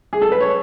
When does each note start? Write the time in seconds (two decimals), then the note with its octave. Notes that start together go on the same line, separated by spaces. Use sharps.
0.13 G#4
0.22 A4
0.32 B4
0.41 C#5